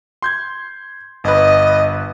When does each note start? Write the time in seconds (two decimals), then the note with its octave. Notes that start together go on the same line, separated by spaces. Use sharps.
0.22 C6 G6 G#6
1.24 G1 B4 D#5